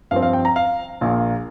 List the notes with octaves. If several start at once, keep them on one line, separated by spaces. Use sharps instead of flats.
G2 F3 C4 F5
F5
G5
A#5
F5
A#1 A#2 A#3